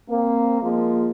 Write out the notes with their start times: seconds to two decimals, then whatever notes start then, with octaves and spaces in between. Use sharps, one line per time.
0.10 A#3 C4
0.62 F3 G#3 A#3